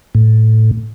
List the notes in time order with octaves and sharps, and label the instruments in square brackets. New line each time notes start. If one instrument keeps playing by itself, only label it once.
[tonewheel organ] A2